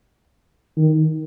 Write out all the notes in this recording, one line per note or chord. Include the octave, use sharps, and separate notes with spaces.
D#3